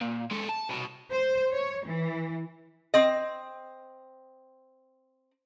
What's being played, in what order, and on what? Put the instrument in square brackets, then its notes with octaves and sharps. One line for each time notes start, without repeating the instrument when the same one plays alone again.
[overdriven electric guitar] A#2
G#3 A4
A5
C2 B2
[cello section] C5
C#5
E3
[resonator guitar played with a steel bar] C4 D#5